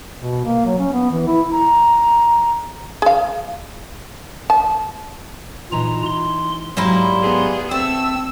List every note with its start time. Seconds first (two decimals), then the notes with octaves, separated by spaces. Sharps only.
0.19 B2
0.45 A#3
0.65 F#3
0.78 C#4
0.92 B3
1.11 E3
1.27 E4
1.52 A#5
3.02 G#4 F5
4.50 A5
5.72 A#2 E3 D#4 F4 A#5
6.06 C6
6.77 G#2 F#3 G3 A#3 E4 G#5 C6
7.22 B3 G#4
7.71 A3 C4 C5 E6